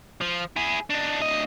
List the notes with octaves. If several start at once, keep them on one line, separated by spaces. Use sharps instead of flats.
F3
E4 G#4
D4 D#4
D2 D#5